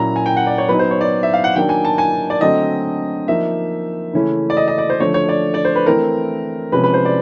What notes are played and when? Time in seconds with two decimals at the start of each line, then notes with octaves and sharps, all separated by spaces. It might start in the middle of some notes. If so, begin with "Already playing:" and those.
Already playing: A#2 F#3 A#3 C#4 E4 A#5
0.16 G#5
0.26 G5
0.37 F#5
0.47 D5
0.58 C#5
0.69 F#3 B3 D#4 B4
0.79 C5
0.91 C#5
1.01 D5
1.23 E5
1.34 F5
1.44 F#5
1.55 D#3 F#3 A#3 D4 G5
1.69 G#5
1.85 A5
1.98 G#5
2.30 D5
2.41 D3 F#3 A3 C4 D#5
3.28 F3 A#3 D#4 E5
4.13 C#3 E3 A3 C#4 E4
4.50 D5
4.57 D#5
4.68 D#5
4.78 D5
4.90 C5
5.00 D3 F3 A3 C#5
5.14 C#5
5.29 D5
5.54 D5
5.65 C5
5.75 B4
5.86 E3 A3 C4 E4 A#4
6.72 C3 F3 G#3 C#4 B4
6.84 B4
6.94 C5
7.05 D5